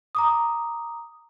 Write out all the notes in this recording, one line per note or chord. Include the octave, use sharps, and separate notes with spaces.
A#5 D6 D#6